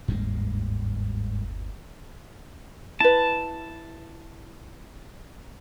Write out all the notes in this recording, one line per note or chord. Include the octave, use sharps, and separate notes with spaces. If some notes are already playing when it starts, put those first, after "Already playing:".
G1 D#2 G#2 G3 G#3
E4 B4 A5